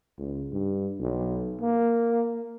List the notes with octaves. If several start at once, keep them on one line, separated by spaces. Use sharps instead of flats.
C#2
G2
B1
A#3